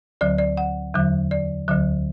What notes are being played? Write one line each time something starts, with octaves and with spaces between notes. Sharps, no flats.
D2 D3 F#3 D5
D5
F#5
E2 D3 F#3
D5
D2 D3 F#3